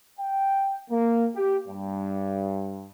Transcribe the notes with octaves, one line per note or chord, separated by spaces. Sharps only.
G5
A#3
G4
G2